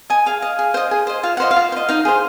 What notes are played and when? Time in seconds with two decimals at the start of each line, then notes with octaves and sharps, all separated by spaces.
0.10 D#5 G#5
0.26 G#4 F5
0.42 D#5
0.59 G#4
0.74 C5 D#5
0.91 G#4
1.07 C5 D#5
1.23 F4 F5
1.37 C5 D#5 F#5
1.51 F5
1.56 F4
1.72 C5
1.76 D#5
1.89 D#4 F5
2.05 G#4 C5